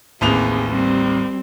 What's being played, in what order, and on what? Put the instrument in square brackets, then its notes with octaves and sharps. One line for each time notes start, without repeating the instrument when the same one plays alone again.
[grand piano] A1 D#2 F7 [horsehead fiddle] C4 G#4
[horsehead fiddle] G3 C4